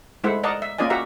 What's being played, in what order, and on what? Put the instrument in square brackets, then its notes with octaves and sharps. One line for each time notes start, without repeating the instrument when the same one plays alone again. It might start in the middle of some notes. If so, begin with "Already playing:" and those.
[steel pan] G#3 A3 E4 C5 E5 F#5
A#4 D5 D#5 F#5 A5 A#5
E5
A#3 C#4 F4 D5 D#5 G#5
F#4 G4 A#4 E5 F#5 A#5